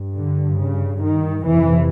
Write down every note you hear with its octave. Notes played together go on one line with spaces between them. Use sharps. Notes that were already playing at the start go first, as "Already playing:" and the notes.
Already playing: G2
D3
C#3
D#3
F2 C3 E3